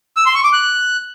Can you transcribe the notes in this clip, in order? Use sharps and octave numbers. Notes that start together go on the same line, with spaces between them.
E6
C6
C#6
D6
F#6